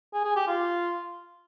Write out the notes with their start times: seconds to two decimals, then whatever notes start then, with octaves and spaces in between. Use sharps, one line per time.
0.14 G#4
0.25 G#4
0.36 G4
0.48 F4